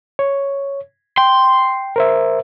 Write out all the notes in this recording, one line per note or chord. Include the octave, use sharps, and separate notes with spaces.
C#5
G5 C6
A#4 C5 E5